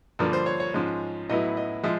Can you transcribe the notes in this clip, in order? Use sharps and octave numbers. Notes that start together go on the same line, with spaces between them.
G2 D3 F3 A#3 D4 A#4
C5
C#5
C#5
G#2 F3 G#3 C#4
A2 F#3 B3 E4 D#5
D#5
F3 G#3 E5